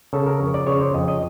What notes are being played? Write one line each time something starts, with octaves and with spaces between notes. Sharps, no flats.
C#3 A4
A#4
F2 C#5
D5
C#3 C#5
C5
F2 D#5
D#5